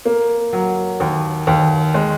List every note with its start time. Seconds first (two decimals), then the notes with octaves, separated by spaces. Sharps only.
0.05 A#3
0.53 F#3
1.00 D#2
1.47 D#2
1.94 G#3